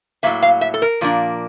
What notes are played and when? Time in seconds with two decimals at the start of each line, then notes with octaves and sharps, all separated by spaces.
0.23 A2 F#3 A#3 E5
0.43 F5
0.61 E5
0.74 A4
0.82 A#4
1.01 A#2 F3 A#3 D4